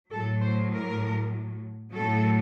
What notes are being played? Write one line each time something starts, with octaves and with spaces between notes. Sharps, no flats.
A2 F#3 A4
C5
A#4
A2 F#3 A4